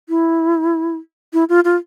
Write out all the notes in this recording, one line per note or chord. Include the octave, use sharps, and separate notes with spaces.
E4
E4
F4
F4